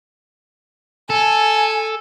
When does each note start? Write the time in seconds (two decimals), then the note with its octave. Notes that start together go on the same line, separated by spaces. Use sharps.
1.10 A4 G#5